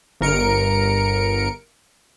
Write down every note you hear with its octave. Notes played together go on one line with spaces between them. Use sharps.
G1 A#4 C#7 D7